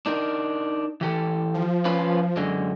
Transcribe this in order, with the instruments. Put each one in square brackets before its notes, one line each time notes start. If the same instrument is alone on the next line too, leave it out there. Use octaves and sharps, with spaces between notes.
[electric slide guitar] D4 D#4 A#4
E3 G4 A4
[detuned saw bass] F3
[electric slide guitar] C#4 F4 B4
F#2 D3 G#3